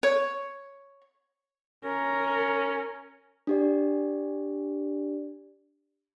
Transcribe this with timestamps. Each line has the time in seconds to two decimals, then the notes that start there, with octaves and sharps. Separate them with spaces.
0.03 C#5
1.85 C#4 A#4
3.47 D4 G4 D5